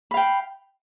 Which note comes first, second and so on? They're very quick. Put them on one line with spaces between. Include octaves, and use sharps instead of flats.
B5 F5 G5